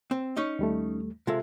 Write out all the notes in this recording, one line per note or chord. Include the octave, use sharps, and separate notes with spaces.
C4
C#4 D#4 D#5
D#2 G3 A3
C3 G#3 F4 A4 E5